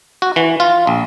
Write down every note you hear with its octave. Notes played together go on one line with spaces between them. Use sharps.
F#4
E3
F4
A#1